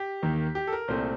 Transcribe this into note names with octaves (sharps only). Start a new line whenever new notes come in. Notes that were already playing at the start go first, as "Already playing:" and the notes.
Already playing: G4
D#2 D#3 A#3
G4
A4
A#4
C2 A#2 A3 C4 C5